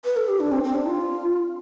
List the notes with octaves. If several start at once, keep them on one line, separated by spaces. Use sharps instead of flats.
B4
A4
G4
D4
C4
C4
D4
F4